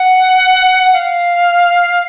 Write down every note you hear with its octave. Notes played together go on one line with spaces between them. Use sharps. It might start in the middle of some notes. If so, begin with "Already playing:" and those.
Already playing: F#5
F5